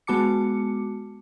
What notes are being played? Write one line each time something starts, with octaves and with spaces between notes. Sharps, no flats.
G#3 B3 F#4 A5 D6 C#7